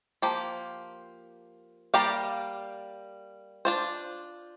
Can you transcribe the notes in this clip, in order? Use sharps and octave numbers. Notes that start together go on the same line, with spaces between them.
F3 A#3 G4
G3 A#3 G4 D5 F5
D4 F4 C5